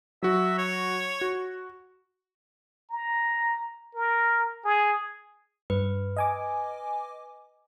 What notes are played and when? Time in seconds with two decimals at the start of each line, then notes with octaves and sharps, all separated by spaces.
0.23 F#3 F#4 E5
0.58 C#5
1.21 F#4
2.90 A#5
3.95 A#4
4.65 G#4
5.70 G2 B4
6.17 D#5 G#5 D6